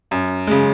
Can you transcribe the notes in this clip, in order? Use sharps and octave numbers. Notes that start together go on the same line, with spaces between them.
F#2
C#3 G#3